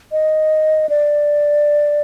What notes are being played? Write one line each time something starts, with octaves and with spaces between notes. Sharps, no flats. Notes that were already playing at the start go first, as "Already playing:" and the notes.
D#5
D5